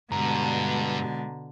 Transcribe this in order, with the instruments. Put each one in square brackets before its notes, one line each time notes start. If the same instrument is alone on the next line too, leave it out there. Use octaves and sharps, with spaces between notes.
[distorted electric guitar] G2 [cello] B2 D3 [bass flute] G#3 [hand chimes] A#5